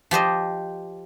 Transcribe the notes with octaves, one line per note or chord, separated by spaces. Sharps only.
F3 G4 C5 D#5